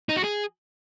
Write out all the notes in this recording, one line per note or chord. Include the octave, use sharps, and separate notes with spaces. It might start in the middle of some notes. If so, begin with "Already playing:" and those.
D#4
F#4
G#4